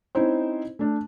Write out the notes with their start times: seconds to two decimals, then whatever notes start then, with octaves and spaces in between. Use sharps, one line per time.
0.15 C4 C#4 D#4 E4 C5
0.79 A3 D4